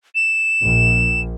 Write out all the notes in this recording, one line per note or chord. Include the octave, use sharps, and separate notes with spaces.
E7
A#1